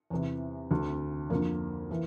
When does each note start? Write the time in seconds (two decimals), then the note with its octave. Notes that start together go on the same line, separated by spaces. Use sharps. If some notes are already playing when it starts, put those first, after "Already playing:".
0.10 E2 C3 E3
0.71 D2 D3
1.30 F2 D3 A#3
1.91 E3